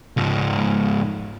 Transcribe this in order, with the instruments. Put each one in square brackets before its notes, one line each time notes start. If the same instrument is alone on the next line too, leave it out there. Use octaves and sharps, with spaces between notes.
[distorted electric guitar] C#2 G#2